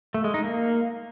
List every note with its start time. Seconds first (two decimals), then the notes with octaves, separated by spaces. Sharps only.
0.14 A3
0.24 G#3
0.34 D#4
0.44 A#3